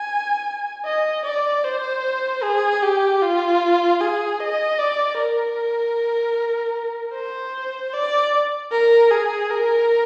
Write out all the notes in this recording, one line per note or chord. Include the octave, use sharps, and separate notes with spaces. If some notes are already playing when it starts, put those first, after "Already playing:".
Already playing: G#5
D#5
D5
C5
G#4
G4
F4
G#4
D#5
D5
A#4
C5
D5
A#4
G#4
A#4